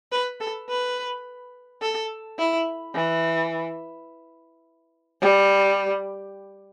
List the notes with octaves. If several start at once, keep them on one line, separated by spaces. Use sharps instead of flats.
B4
A4
B4
A4
E4
E3
G3